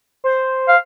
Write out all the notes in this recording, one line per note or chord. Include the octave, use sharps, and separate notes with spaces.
C5
F5